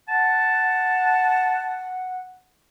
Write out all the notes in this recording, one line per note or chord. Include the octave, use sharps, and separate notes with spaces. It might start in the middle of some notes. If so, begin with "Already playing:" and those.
F#5 A5